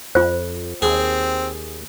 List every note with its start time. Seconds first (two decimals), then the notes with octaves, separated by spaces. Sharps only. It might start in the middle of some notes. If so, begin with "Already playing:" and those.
0.15 F2 F4 C5
0.82 D#2 C4 G#4